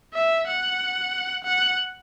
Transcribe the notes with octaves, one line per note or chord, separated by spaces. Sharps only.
E5
F#5
F#5